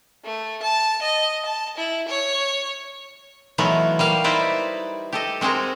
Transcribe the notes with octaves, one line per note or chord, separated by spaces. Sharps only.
A3
A5
D#5
A5
E4
C#5
E3 F#3 A3 B3 D#4 F4
G3 A#3 F5
D#4 E4 B4 C5 D5
G4 A4 D#5
G#3 C4 F#4 G#4 A#4